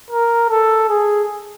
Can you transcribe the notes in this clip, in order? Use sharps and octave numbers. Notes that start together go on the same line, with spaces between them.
A#4
A4
G#4